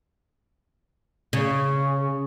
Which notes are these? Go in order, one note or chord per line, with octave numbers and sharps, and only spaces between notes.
C#3